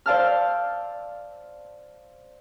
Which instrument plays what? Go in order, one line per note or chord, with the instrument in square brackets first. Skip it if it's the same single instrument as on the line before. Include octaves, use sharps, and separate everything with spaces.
[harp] C5 D5 F5 A5 E6 F6